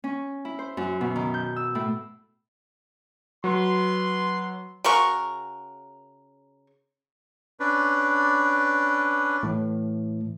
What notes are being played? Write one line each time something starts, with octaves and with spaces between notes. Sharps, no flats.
C#4
E4
C5
F#2
B2
D#3
G6
E6
A2
F#3 B4 C6
C#3 F#4 A#4 C#6
C#4 D4 B4
A2 E3